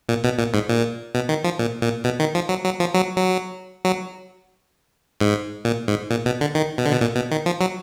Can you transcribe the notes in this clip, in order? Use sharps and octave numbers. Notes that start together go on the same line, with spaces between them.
A#2
B2
A#2
G#2
A#2
B2
D#3
F3
A#2
A#2
B2
D#3
F3
F#3
F#3
F3
F#3
F#3
F#3
G#2
A#2
G#2
A#2
B2
D3
D#3
B2
D3
B2
A#2
B2
D#3
F3
F#3